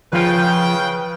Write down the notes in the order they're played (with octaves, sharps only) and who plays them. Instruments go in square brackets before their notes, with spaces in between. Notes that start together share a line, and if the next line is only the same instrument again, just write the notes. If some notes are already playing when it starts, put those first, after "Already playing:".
[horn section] C#3 B4 G5 [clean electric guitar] F3 F4